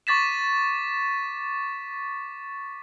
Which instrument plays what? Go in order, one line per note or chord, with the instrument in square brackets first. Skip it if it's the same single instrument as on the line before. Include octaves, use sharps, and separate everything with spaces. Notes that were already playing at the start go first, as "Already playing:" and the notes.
[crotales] C#6 D6 A6 B6 E7